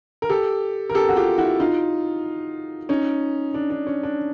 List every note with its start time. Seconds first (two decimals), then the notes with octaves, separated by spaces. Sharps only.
0.22 A#4
0.29 G4 A4
0.89 A#4
0.94 G4 A4
1.09 F#4
1.16 F4 G4
1.38 E4 F#4
1.60 D#4 F4
2.89 C#4 D#4
3.54 D4
3.70 D4
3.87 C#4
4.03 D4